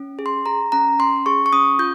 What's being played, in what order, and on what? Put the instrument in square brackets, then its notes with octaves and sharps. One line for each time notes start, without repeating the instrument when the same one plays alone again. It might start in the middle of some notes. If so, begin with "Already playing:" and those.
Already playing: [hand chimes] C#4
G#4
C6
G#4 A#5
C#4 A#5
C#4 C6
G#4 C#6
C#6
C#4 D#6
F4 G6